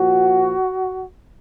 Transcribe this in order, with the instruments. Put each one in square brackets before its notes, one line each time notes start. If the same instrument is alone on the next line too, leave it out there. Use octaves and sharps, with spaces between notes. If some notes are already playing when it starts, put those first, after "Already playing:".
Already playing: [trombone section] A#2 F3 F#4